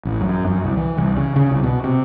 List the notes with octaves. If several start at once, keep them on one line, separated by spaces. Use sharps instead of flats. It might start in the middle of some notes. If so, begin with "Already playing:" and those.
A1
F#2
F#2
C2
E3
C2
C#3
C#3
C2
B2
C3